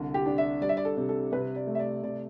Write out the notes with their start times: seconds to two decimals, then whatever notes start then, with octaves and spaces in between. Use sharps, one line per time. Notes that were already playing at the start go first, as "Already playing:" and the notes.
Already playing: C2 D3
0.14 G4
0.26 D4
0.38 E5
0.61 G3 D5
0.69 E5
0.77 D5
0.85 A4
0.97 C3
1.09 A4
1.32 C3 B4
1.56 D5
1.67 A3
1.75 E5
1.79 D5
2.03 C3 D5